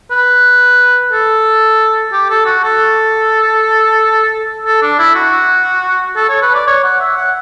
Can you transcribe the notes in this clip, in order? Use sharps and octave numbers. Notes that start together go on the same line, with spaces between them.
B4
A4
G4
A4
F#4
A4
A4
D4
E4
F#4
A4
C#5
B4
D5
C#5
F#5
E5
F#5